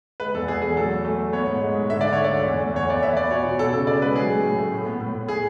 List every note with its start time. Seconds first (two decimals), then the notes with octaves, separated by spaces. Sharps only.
0.20 G#3 B4
0.34 E2 A4
0.48 E2 G#4
0.62 E2 G#4
0.77 F#3 A4
0.91 A3
1.05 A3
1.18 A3
1.33 B3 C#5
1.47 G#2
1.62 G#3
1.75 G#2
1.89 D3 E5
2.01 D3 D5
2.13 C#5
2.18 A3
2.24 D5
2.32 D2
2.46 E2
2.60 A3
2.74 E2 C#5
2.89 E2 D5
3.03 B3 E5
3.16 B3 D5
3.31 B2 C#5
3.45 B2
3.59 B3 A4
3.73 C#3 A4
3.87 C#3 D5
4.01 G#3 B4
4.15 F#3 G#4
4.29 A3
4.44 A2
4.58 A3
4.72 A2
4.87 B3
5.01 A2
5.15 A2
5.28 G#4